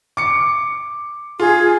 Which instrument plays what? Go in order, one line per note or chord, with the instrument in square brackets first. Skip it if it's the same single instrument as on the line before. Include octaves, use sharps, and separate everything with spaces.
[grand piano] D6 C#7
[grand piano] F4 [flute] G#4